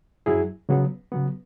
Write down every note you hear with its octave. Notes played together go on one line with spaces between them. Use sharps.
F#2 F#3 E4 G#4
C#3 F#3 B3
C#3 F#3 B3